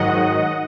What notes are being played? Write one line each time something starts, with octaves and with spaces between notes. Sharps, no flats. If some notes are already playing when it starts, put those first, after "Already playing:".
Already playing: G#2 D#3 F#3 D#5 F#5